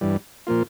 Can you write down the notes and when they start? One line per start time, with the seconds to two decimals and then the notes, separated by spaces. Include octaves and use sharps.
0.01 G2 E3 G3
0.47 A#2 F3 A#3 F4